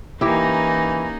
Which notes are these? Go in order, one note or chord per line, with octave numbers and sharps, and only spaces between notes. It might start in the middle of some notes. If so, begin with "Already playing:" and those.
E3 A#3 C#4 D#4 E4 G4